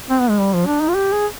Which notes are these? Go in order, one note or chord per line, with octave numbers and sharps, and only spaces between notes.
C4
B3
G#3
G3
F3
D4
D#4
F4
G4
G#4